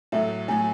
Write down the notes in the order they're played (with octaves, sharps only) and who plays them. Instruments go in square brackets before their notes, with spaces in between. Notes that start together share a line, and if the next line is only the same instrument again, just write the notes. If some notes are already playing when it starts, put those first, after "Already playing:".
[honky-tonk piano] A2 F#3 A3 [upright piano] E5
[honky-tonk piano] A2 F#3 A3 [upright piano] G#5